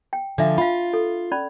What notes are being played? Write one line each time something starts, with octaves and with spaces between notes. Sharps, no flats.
G5
D3 F3 D4 E5
F4 F5 B5
A4
C#4 D5 B5